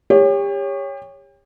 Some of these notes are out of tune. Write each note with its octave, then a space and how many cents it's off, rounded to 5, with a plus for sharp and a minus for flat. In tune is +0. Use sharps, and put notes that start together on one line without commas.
G4 +35 C#5 +0